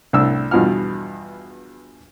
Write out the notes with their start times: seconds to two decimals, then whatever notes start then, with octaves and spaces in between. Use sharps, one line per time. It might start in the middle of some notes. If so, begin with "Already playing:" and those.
0.13 C2 A2 D4 E6
0.51 E2 G2 B2 F3 F#5 F6